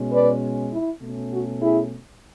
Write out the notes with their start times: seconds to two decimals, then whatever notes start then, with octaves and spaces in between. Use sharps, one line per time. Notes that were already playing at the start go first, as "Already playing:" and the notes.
Already playing: B2 G#3 C#4
0.12 B4 D5
0.72 E4
1.02 B2 A3 C#4
1.32 F#4
1.62 E4 G#4